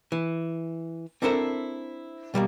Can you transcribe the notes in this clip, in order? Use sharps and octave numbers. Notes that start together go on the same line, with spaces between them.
E3
C4 D4 E4 A4 A#4 C5
B2 G3 G#3 A#3